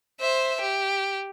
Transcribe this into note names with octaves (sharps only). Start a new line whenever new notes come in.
C5 E5
G4